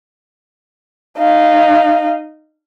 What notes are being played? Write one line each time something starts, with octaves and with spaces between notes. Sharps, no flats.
D#4 F5